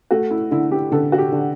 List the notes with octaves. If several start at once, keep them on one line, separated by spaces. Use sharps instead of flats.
A3 F#4
E4
D3 E4
G4
D3 A4
F#4
G4
D3